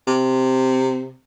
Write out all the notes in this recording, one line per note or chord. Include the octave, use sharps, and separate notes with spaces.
C3